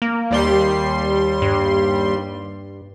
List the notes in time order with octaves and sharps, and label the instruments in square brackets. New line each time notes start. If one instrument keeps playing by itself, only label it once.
[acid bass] A#3
[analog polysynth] D#2 G3 C6
[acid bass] G2